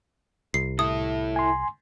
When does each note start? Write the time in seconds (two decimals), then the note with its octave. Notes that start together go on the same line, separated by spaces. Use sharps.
0.54 C2 C7
0.79 E4 A4 D#6
1.36 G#5 C6